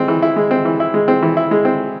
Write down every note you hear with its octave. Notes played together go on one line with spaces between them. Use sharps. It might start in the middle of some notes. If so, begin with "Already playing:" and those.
Already playing: G#3 C4
E3
E4
G#3
C4
E3
E4
G#3
C4
E3
E4
G#3
C4